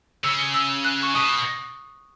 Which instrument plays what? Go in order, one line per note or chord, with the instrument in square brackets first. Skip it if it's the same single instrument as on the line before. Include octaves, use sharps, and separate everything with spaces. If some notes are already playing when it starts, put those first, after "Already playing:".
[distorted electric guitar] C#3 [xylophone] E6
[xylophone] E6
F#6
C#6
[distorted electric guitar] B2 [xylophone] D#6